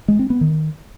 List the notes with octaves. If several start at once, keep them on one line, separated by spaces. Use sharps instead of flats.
G#3
C4
B3
D#3